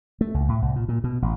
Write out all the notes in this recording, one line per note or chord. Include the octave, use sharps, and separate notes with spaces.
A3
C#2
A2
C2
A#2
A#2
B2
A1